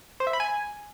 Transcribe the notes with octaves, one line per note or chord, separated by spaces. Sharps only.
C5
E5
B5
G#5